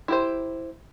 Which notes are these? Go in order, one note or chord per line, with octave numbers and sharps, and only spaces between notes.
E4 G4 C5